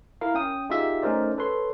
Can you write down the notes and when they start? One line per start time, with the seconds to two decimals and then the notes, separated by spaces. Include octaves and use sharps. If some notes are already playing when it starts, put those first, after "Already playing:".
0.21 E4 A#4 F5
0.34 C#4 G5 D#6
0.70 D#4 F4 G4 G#4 E5
1.02 A3 C#4 D#4 A#4 C5 D5
1.37 A4 B4 C#5 C6